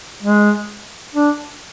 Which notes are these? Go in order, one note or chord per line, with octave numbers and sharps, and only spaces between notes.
G#3
D4